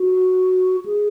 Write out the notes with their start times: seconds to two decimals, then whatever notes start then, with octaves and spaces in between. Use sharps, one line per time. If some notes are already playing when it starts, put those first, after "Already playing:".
Already playing: F#4
0.86 G#4